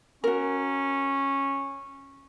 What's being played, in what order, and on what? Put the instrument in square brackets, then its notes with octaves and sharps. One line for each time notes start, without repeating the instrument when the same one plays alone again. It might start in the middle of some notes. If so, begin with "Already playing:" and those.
[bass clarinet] C#4 [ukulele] F#4 A#4